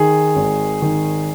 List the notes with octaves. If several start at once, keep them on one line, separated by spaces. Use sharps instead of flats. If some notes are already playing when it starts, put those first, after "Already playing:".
Already playing: D#3 G#4
G#1
D#3